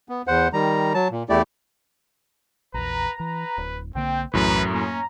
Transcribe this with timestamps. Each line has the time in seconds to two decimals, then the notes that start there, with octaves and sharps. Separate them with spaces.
0.09 B3
0.27 E2 C5 F#5
0.53 D#3 G3 A#5
0.94 F#3 A5
1.11 A#2
1.29 E2 A3 E4 G4 D5
2.74 A#1 E2 B4 A#5
3.20 E3 B4
3.58 D1
3.95 B1 D3 A#3 C4 G5
4.33 B1 F#2 A2 E3 B4 A#5
4.73 A#3 C#4